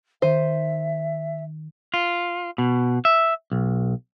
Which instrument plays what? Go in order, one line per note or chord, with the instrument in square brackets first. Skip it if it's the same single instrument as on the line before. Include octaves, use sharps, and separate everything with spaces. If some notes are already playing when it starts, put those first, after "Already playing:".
[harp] D#3 D#7 [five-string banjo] C5 [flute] E5
[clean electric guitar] F4
B2
E5
B1